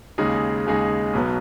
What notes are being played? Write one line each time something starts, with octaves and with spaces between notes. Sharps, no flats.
D#2 C#3 G#3 D#4 G#4
D#2 C#3 G#3 D#4 G#4
B1 B2 F#3 B3